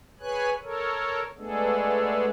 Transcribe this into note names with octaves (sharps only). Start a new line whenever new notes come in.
G#4 B4 C#5 G#5 F#6
A4 A#4 C#5
G#3 A3 B3 D4 G#4 A4